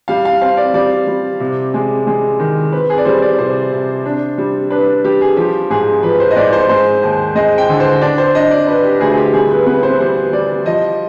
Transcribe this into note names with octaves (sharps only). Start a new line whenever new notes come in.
G3 F5
F5
C4 F5
D5
G3 D5
G3
C3
G#3
G#3
D#3
C4 B4
G#4
D5
G3 C5
D5
C3 C5
C3
D4
G3
D4 B4
G3 G4
G#4
F3 G4
G#2 G#4
F3 B4
C5
D#5
G#2 D5
C5
G#3 C5
D#2
G#3 D#5
G5
D3
C5
D4 D5
C5
D4 D#5
D5
D4 B4
G4
D2 G#4
G#4
G4
G3 G#4
B4
B3 B4
C5
G3 C5
G3 D5
F3 D#5